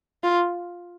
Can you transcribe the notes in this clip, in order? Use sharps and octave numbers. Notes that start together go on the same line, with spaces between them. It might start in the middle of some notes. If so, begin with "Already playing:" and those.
F4